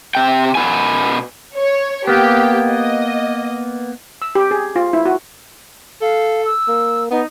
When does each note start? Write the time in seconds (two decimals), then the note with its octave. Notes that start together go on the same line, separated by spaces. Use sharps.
0.15 C3 G5
0.55 B2 B3 G#5
1.57 C#5
2.07 A#3 B3 G4
2.69 D#5
4.22 E6
4.35 G4
4.51 G#4
4.76 F4
4.93 E4
5.05 F#4
6.02 A4 F5
6.44 E6
6.68 A#3
7.11 B3 D#4